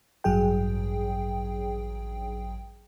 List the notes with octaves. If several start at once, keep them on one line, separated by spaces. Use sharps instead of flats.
A1 G2 F#3 G#4 G5